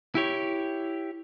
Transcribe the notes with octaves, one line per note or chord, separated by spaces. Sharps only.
E4 G4 C#5